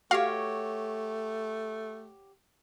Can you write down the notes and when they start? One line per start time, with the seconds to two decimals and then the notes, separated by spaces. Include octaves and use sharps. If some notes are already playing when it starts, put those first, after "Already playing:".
0.11 A3 F#4 G4 C#5 F5